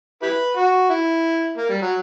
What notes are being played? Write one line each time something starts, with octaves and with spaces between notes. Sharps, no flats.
E4 G4 B4
F#4
E4
A#3
G3
F#3